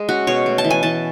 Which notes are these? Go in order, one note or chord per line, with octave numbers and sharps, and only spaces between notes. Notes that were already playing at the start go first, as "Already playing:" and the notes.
Already playing: G#3 G#4
C#4 F#4
B2 C#5
A3
A5
E3
G#5
E3 A5